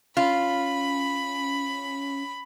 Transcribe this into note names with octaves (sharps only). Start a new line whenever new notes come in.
C#4 F4 B5